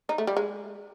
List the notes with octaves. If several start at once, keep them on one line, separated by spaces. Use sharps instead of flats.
D#4
A3
G3
G#3